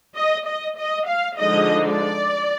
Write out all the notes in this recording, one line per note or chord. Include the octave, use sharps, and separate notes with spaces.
D#5
D#5
D#5
F5
D3 F3 G#3 D#4 D#5
D5